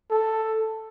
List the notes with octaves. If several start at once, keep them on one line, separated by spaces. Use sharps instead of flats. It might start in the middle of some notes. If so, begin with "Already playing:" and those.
A4